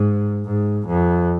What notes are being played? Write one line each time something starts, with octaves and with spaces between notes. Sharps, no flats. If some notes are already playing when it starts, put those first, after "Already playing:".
Already playing: G#2
G#2
F2